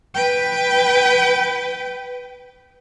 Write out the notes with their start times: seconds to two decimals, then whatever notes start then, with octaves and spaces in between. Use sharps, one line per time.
0.15 B4 G5